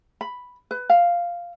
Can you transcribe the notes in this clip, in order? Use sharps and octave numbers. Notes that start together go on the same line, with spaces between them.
B5
B4
F5